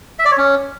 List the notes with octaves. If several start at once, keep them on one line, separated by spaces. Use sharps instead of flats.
E5
D5
C#5
C#4